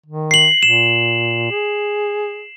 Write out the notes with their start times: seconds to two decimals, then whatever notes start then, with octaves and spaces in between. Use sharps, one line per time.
0.06 D#3
0.31 C7 F#7
0.63 A#2 E7
1.51 G#4